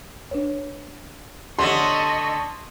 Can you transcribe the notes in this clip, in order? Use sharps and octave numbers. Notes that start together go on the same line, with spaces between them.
D4 B4 C#5
D3 A3 G4 C#5 D#5 F#5 C6 C#6